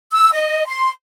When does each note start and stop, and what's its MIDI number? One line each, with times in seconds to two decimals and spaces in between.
0.12 0.30 88
0.33 0.64 75
0.67 0.89 84